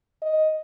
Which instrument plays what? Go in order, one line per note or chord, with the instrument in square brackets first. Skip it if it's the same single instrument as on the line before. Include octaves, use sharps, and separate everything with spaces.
[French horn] D#5